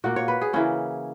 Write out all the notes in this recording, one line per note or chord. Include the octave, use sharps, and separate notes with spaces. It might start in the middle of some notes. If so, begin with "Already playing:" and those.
A#2 A#3 F#4
C#5
B4
G#4
C#3 E3 A#3 C#4